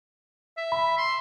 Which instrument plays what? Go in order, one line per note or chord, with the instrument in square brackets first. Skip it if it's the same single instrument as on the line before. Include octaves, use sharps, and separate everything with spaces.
[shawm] E5
[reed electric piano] B5
[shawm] C6